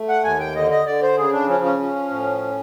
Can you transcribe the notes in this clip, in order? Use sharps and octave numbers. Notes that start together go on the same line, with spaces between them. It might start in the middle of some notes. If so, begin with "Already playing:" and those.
Already playing: A3
F#5
D#2 G#5
G5
D3 D#5
D#5
D3 D5
C5
C#3 G#4
D4
F3 C#4
C#4
F3
A2